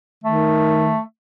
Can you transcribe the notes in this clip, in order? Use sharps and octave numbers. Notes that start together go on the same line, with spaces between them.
D#3 A3